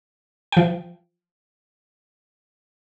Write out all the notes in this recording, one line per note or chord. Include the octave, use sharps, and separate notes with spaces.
F3 G5